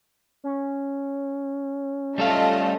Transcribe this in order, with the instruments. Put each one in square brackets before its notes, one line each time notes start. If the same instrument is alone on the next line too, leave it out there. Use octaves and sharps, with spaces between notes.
[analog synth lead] C#4
[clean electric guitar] G3 A4 F5 [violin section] A3 F4 D#5